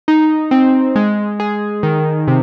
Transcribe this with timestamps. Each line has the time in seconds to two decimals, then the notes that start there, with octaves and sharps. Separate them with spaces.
0.08 D#4
0.51 C4
0.96 G#3
1.40 G#4
1.83 D#3
2.28 C3